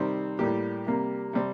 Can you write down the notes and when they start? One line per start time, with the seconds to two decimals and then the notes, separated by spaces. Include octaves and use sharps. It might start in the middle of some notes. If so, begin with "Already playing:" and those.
Already playing: C3 D#3 G3 C4
0.39 A2 G3 A#3 G4
0.86 C3 G3 A#3
1.33 C3 G3 C4